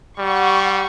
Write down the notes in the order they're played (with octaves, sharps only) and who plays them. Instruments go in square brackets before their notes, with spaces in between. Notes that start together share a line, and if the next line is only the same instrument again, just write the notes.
[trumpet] G3 [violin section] F#5 C#6